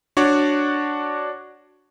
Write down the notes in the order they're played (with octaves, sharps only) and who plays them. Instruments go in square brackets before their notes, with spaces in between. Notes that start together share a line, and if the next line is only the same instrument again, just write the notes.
[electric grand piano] D4 F#4 C#5 D5